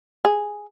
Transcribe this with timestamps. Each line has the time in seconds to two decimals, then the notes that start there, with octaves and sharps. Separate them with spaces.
0.25 G#4